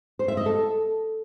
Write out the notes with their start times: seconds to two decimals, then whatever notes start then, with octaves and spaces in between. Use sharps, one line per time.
0.19 C5
0.28 E5
0.37 D#5
0.46 A4